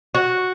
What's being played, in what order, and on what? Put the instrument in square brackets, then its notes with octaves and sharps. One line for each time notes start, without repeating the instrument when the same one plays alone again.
[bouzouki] F#4